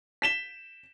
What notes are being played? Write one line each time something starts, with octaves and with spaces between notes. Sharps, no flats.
B6 E7 G7